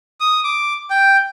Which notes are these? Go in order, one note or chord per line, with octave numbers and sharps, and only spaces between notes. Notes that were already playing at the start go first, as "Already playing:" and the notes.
D#6
D6
G5